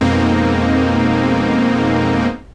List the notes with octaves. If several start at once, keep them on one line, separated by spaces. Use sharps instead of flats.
F2 B2 G#3 A#3 C4 D#4